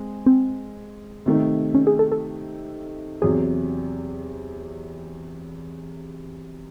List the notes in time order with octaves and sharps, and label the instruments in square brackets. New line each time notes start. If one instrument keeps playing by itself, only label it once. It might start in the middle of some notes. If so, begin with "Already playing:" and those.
Already playing: [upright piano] G#3 C4
[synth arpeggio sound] C4
[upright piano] C3 D#3 A3 D#4
[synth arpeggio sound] C#4
G#4
A4
A4
[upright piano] E2 C3 F#3 [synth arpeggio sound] G#4